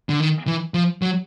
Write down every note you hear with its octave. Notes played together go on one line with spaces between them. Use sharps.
D3
D#3
E3
F3
F#3